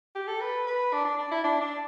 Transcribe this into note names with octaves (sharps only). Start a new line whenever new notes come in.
G4
A4
B4
B4
D4
D4
D4
E4
D4
D4